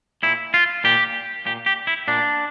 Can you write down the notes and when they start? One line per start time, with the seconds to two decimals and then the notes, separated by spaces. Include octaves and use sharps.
0.23 A#2 E4
0.54 F4
0.84 A#2 G4
1.46 A#2 G4
1.66 G4
1.87 E4
2.08 A#2 D4